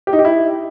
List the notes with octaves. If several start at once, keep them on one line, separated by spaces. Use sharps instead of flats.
G4
D#4
G4
E4